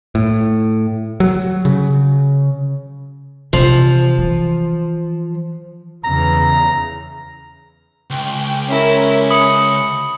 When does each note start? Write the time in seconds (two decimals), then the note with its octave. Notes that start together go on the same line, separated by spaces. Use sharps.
0.15 A2
1.20 F#3
1.65 C#3
3.53 C3 E3 F3
4.18 E3
6.04 E2 C#3 E3 A#5
8.10 C#2 G5
8.69 C#4 E4 A#4
9.31 B5 D#6 C#7 F#7